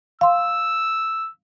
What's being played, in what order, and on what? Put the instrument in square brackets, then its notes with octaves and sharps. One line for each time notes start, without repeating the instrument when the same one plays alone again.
[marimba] F5 C6 [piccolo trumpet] E6